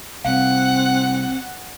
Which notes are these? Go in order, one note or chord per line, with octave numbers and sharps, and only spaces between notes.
C2 C4 F5 F#5